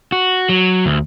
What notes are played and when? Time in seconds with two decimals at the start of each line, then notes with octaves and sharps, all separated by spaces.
0.12 F#4
0.49 F#3
0.86 D2